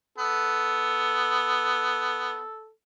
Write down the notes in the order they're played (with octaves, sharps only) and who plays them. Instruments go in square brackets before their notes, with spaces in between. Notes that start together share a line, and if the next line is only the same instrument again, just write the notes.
[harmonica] B3 [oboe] A4